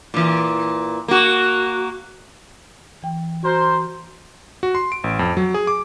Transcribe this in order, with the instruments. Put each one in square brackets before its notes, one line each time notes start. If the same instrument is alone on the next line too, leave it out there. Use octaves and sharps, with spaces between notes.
[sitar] A#2 E3
A#3 F#4
[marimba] E3 G5
[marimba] F#4 [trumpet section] A#4 C5
[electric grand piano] F#4
C6
D7
A1
F2
F#3
G#4
D6